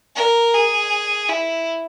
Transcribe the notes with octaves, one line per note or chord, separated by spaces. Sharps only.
A#4
G#4
E4